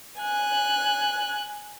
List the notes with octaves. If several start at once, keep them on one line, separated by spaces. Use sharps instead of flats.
G#5 F#6